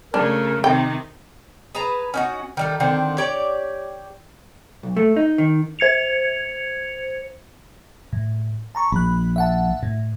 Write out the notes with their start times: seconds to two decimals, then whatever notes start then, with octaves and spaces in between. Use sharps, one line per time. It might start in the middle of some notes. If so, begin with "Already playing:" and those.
0.14 C#3 A3 D4 A#4
0.64 C3 D#3 G5
1.75 G#4 B4 A5 A#5
2.14 C#4 D#4 F#4
2.57 D#3 G3 A3
2.80 D3 D#3 C4 D4
3.18 G4 C#5 D5
4.83 B1
4.97 A3
5.16 D#4
5.38 D#3
5.79 C5 G#6 C#7 F7
8.13 A2
8.75 A5 A#5 C#6
8.92 A#1 B5 F#6
9.36 E5 F#5 A5
9.83 A2